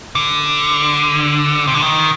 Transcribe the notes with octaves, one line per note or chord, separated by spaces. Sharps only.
D3
C3
D3
D#3